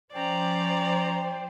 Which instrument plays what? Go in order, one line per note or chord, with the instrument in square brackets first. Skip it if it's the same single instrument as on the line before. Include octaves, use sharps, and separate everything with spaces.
[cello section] F3 C5 [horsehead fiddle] C#4 A#5 [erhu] D5 [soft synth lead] G5